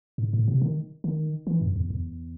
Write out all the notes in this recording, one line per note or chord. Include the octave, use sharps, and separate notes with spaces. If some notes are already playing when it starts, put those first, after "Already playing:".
G#2
A2
C3
D#3
D#3
E3
F#2
E2
E2